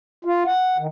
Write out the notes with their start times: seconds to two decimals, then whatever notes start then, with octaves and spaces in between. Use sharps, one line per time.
0.25 F4
0.46 F#5
0.78 D#3